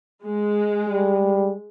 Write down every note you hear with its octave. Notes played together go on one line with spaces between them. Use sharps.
G#3
G3